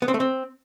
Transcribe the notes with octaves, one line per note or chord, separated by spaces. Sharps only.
B3
C4
A3
C4